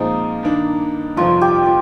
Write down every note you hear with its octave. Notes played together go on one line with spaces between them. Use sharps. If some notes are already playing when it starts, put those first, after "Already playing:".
Already playing: A#2 F3 G#3 C4 D#4
G2 D#3 A#3 D4
G1 F2 C3 F3 F4
G4
F4